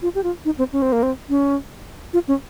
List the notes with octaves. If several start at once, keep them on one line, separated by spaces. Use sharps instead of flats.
F4
G4
F4
D#4
C4
C#4
C4
A#3
C4
C#4
F4
C#4